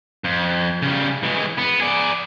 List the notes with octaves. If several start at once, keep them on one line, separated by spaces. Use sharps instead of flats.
F2
C#3 G3
E3 G#3
B3
G#4 D5